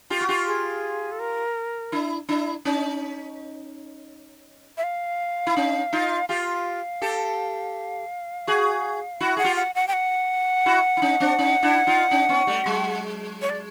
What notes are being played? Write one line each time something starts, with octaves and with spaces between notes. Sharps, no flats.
F4 G4
F#4
F4 G4
G#4
A4
A#4
D4 E4
D4 E4
C#4 D#4
E5
F5
E4
C#4 D#4
D#4 F4
F4 G4 F5
G4 A4
F#4 G#4
E4 F#4 F#5
G#4 F#5
F4 G4
F#5
F#5
G5
F#5
E4 F#4
E4
C#4 D#4
C4 D4
C#4 D#4
D4 E4
D#4 F4
C#4 D#4
B3 C#4
G3 A3
F#3 G#3
C#5
D5